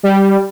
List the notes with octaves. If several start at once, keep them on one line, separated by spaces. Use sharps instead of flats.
G3